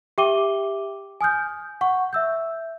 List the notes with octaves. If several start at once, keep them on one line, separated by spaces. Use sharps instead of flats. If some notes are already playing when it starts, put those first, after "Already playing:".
G4 E5 G5 D6 D#7 G7
G#5 D#6 F6 G6
F#5 C#6
E5 E6 G6